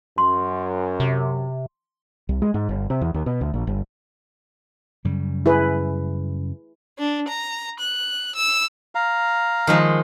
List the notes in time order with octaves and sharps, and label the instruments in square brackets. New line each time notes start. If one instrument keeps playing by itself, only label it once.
[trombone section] F#2 [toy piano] C6
[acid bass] C3
[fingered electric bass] C2
G#3
G#2
G1
C3
E2
D#2
B2
D2
A#1
G1
[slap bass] F#2 C#3 G3
[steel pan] E4 G#4 B4
[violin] D4
A#5
F#6
E6
[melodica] F5 A#5
[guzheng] D#3 F3 G#3